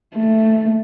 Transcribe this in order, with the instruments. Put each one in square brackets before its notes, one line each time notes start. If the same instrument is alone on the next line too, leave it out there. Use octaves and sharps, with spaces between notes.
[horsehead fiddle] A3